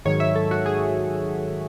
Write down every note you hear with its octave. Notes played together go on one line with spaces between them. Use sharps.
G#2 D#3 F#3 C#5
E5
A4
F#4
G#4